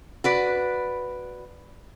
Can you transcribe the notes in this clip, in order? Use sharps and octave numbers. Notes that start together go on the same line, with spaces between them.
F#4 B4 D5